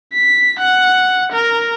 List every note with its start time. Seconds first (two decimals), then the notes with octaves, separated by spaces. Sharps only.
0.13 B6
0.59 F#5
1.32 A#4